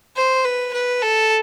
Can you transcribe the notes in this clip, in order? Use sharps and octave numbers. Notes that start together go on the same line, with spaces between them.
C5
B4
B4
A4